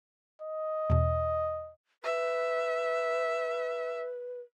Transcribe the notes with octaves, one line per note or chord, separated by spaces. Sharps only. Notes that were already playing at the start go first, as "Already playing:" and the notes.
D#5
E2 B2
B4 E5